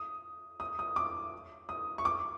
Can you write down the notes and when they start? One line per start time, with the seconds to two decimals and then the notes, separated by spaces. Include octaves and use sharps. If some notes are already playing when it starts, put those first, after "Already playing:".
Already playing: D#6
0.60 D#6
0.79 D#6
0.96 D6
1.69 D#6
1.98 C#6
2.05 D6